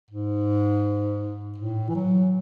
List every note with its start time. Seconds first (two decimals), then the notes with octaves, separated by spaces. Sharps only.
0.11 G#2
1.58 A2
1.89 E3
1.95 F#3